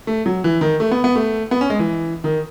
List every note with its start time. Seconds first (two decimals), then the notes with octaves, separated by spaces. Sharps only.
0.07 A3
0.26 F#3
0.44 E3
0.61 D#3
0.80 A3
0.91 B3
1.04 B3
1.16 A3
1.51 B3
1.61 C#4
1.70 G#3
1.79 E3
2.24 D#3